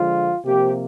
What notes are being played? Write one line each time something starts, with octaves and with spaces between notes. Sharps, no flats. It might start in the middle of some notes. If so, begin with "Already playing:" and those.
Already playing: D3 F3 G#3 F4
C3 F3 A#3 G4